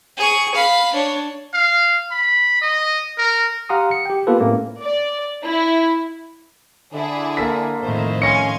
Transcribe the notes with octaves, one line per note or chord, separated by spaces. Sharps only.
G#4 C#6
F5 B5
D4 C#5
F5
B5
D#5
A#4
G4 F5 F#5 A#5 C6 D#6
C#7
G4 G5
A#3 B3 F4 G4 A4 B4
A2 A3 A#3 C4 C#4
D5
E4
D3 D4 E4 G#4
A#3 A4 B6
F2 A2 D#3 C5
C#4 F5 G#5 C6 A#6 C#7